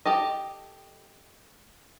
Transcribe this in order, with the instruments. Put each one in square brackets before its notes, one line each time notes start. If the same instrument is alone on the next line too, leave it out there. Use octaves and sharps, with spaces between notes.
[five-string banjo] G4 A4 D#5